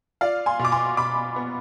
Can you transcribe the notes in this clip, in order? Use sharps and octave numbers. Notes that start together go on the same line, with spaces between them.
F4 D5 F5
G#5 C6
B2
D6
G#5 C6
B2 B5 D6
B3